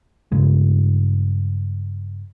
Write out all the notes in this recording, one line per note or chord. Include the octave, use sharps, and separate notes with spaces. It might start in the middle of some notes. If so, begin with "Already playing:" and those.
G2 C#3 G#3